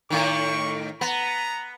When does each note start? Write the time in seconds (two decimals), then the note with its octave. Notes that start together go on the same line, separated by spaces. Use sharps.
0.10 A2 D#3 C#6
1.01 B3 A#5